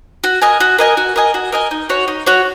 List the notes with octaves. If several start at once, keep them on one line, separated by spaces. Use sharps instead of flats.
F#4
A#4 D#5 G#5
F#4
A#4 D#5 G#5
F#4
A#4 D#5 G#5
F#4
A#4 D#5 G#5
D#4
F#4 C#5
D#4
F#4 C#5